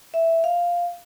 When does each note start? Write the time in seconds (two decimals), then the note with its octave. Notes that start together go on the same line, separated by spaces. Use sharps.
0.14 E5
0.44 F5